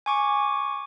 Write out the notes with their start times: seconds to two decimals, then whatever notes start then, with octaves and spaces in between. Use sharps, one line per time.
0.06 G#5 C#6 D6